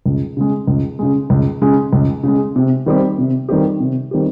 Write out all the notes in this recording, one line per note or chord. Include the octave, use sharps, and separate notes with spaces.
C#2
C#3 G#3
C#2
C#3 G#3
C#2
C#3 G#3
C#2
C#3 G#3
C3
D#3 G3 C4 G4
C3
D#3 G3 C4 G4
C3
D#3 G3 C4 G4